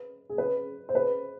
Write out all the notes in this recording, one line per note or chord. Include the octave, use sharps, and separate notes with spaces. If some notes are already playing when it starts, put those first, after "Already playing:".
Already playing: B4
G#4
B4
C5
B4